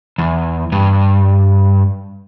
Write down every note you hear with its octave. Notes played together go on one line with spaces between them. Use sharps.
E2
G2